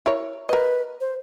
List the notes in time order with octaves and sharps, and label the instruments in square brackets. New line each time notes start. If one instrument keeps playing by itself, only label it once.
[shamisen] E4 A#4 C#5
[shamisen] A#4 D#5 [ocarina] B4
[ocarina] C5